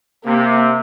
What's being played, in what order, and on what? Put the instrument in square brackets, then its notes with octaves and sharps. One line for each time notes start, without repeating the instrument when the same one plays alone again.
[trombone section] C3 [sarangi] A#3